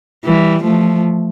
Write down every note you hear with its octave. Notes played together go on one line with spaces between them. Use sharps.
E3 G3
F3 A3